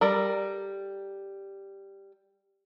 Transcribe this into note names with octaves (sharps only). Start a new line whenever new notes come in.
G3 A4 A#4 B5